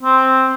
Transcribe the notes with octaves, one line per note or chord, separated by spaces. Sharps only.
C4